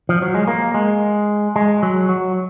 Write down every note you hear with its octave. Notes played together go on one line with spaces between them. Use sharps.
F3
F#3
G#3
A#3
G#3
G#3
F#3
F#3